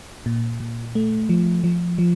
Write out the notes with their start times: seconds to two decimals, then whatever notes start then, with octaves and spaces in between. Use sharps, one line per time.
0.26 A#2
0.60 A#2
0.95 A3
1.29 F3
1.64 F3
1.98 F3